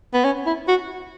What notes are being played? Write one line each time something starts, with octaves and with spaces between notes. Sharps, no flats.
B3
C#4
E4
F#4